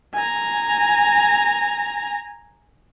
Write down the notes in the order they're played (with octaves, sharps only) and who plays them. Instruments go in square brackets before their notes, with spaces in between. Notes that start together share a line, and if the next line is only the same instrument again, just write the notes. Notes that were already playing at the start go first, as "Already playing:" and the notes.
[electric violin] G#5 A#5